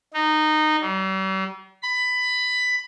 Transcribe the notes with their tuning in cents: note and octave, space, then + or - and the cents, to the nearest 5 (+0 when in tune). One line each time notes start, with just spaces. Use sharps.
D#4 -15
G3 -45
B5 +15